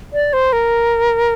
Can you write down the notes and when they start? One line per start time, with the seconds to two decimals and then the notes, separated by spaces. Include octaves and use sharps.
0.13 D5
0.33 C5
0.53 A#4